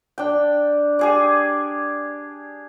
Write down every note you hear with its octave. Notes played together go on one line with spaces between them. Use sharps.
D4 G5
G4 G#4 D5